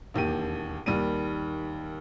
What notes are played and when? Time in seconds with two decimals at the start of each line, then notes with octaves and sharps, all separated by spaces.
0.14 E1 D#2 G4 D#7
0.86 D#2 D#3 G3 D#7